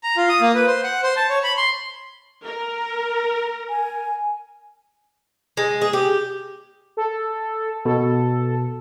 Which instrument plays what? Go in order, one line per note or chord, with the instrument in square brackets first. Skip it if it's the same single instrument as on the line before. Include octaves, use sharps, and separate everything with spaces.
[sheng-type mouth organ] A#5
F4
D#6
A#3
B4
C5
F#5
C5
A5
C#5
B5
C6
[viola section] A#4
[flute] G#5
[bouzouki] G#3
G#4
G4
[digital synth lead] A4
[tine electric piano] B2 [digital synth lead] A4